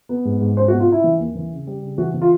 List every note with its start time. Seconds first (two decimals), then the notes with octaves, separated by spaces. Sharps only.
0.09 B3
0.25 G#2
0.41 G#2
0.57 C#4 C5
0.68 F#4
0.72 B2
0.80 F4
0.88 C#4 E4
1.04 E3
1.20 D#2
1.35 E3
1.51 C#3
1.67 G3
1.82 C#3
1.98 E3 F#4
2.14 E3
2.22 F4